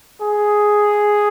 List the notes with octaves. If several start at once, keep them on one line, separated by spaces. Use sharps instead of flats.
G#4